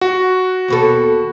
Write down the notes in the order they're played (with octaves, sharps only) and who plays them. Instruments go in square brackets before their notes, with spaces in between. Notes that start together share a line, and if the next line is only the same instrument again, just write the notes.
[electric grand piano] F#4
[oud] D#2 B2 A4